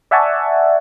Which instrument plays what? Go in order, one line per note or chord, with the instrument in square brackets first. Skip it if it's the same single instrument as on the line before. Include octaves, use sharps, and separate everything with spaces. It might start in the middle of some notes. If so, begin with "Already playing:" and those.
[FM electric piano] D5 E5 F#5 G#5 A5 C#6